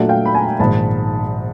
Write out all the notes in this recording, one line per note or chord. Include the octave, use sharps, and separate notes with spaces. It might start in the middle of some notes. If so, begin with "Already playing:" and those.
Already playing: A#2 F#3 A3 D4 E5 F#5
F5 G5
B5
G#5 A#5
A#1 G#2 D#3 A5 B5